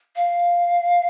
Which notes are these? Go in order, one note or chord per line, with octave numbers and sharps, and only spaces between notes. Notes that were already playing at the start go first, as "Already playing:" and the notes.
F5